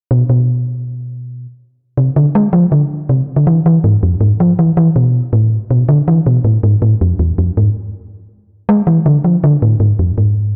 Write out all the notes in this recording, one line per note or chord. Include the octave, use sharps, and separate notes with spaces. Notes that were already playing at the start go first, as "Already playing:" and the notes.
B2
B2
C3
D3
G#3
F3
D3
C3
D3
E3
E3
G#2
F2
G#2
F3
E3
E3
B2
A2
B2
D3
E3
B2
A2
G#2
A2
F2
E2
F2
G#2
G#3
E3
D3
F3
D3
A2
G#2
F2
G#2